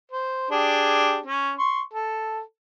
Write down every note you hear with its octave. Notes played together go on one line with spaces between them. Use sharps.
C5
D4 G4 G#4
C#4
C6 C#6
A4